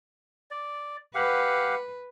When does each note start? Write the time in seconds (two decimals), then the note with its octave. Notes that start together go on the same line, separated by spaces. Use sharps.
0.51 D5
1.15 G4 B4 F5 F#5